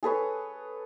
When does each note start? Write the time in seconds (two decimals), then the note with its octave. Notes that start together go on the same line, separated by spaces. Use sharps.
0.03 G#4 A4 B4 C#5